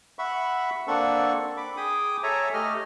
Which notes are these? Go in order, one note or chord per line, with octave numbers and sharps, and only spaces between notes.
E5 F#5 B5 C#6
A#3 C4 D4 A4 F#5 C#6
B5 D6
G#4 G5 D6 D#6
A4 C#5 E5 G#5 A#5
A3 G4 D#5 F6